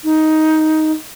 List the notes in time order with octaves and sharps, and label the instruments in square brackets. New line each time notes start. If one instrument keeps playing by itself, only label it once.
[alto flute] D#4